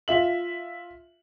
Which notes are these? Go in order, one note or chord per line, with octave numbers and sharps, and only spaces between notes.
F4 E5 F#7